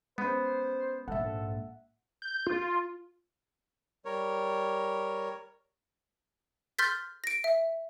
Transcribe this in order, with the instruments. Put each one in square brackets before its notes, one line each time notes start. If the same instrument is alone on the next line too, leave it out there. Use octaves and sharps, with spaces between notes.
[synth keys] G#3 C#4 [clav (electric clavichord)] B3 [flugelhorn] C5
[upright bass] A#1 G#2 [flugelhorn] A4 [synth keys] E5 F#5
[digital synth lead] G6
F4
[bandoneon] G3 A#4 C#5
[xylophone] C6 F6 G6 A6 B6
A#6 D7
E5